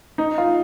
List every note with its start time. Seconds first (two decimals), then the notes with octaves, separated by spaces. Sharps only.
0.18 D#4
0.38 F4